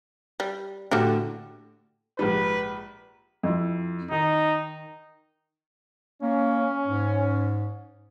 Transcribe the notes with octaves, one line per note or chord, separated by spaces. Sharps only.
G3
A2 D3 G3 A3 F#4 G4
A#1 G#2 G3 B4
F2 E4
D#3 D#4
A#3 C#4
G#2